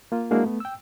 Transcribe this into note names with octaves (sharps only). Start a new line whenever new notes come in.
A#3 F4
G#3 A#3 D4 E4 F#4 G#4
A3 B3
G5 E6